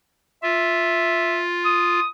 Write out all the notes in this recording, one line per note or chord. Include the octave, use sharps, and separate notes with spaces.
F4 E5
D#6